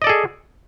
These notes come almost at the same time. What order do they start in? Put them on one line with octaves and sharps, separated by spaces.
D#5 D5 A4 G#4